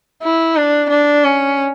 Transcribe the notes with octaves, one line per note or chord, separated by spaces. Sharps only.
E4
D4
D4
C#4